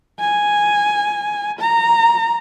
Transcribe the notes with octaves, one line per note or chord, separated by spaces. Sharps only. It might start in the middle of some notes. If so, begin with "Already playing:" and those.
G#5
A#5